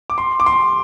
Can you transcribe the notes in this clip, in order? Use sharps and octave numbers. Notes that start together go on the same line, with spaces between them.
D6
C6
D6
C6